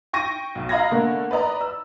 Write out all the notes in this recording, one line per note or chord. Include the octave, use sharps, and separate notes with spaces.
G5 C#6 A#6 D#7
B1
D#5 F5 A#5 B5 G#6 A#6
D3 A3 A#3
B4 D5 D#5 A#5
E6